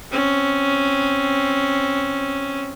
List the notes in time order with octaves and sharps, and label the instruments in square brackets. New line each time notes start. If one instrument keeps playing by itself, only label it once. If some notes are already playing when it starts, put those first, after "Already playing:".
[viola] C4 C#4